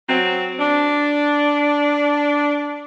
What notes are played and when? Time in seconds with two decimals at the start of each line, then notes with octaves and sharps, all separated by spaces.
0.08 F#3 C4
0.59 D4